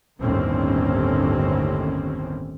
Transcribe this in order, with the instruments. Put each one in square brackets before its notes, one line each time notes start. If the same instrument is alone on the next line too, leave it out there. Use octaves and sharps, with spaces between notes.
[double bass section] G1 D#2 A2 D#3 C4 C#4